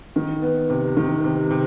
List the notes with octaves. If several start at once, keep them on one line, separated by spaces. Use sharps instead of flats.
D#3
B3
C3
D#3
C3
C3